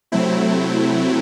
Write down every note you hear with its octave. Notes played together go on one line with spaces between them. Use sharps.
C3 F#3 A3 C4 E4